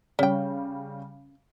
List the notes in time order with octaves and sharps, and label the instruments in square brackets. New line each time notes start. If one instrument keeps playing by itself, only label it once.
[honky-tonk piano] C#3 G3 [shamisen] C#4 G5